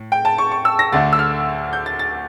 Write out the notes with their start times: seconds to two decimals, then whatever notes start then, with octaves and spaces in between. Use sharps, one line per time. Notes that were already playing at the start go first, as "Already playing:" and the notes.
Already playing: A2
0.12 G5
0.25 A5
0.38 C#6
0.52 C#6
0.65 E6
0.79 A#6
0.92 D2 D3 A3 A6
1.13 E6
1.19 F6
1.73 G6
1.86 A6
1.99 A6